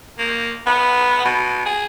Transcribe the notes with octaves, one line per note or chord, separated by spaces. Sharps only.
A#3
B3
B2
G#4